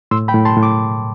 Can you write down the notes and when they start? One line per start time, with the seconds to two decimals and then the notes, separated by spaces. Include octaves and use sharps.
0.11 A2 C6 E6
0.28 G5 B5
0.34 A2
0.45 A5 C6
0.57 A2
0.63 D6